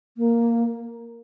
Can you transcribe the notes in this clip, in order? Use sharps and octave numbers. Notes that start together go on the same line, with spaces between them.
A#3